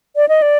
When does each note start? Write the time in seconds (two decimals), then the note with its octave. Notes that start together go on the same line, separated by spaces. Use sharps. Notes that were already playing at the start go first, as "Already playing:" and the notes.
0.16 D5
0.29 D#5
0.42 D5